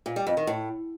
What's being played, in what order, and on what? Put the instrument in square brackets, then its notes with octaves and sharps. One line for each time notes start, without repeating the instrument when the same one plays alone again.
[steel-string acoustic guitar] A#2
G3
F2
D#3
A2